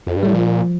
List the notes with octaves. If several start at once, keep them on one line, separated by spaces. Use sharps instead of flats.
F2
G2
A2 G3
A#2 F3